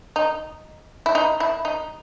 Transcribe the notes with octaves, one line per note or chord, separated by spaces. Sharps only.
D#4
E4
D#4
E4
D#4